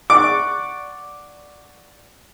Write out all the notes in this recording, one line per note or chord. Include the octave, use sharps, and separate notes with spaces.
D5 F#5 C#6 D6